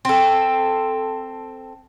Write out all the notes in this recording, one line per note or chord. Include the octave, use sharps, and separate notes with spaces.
C4 A4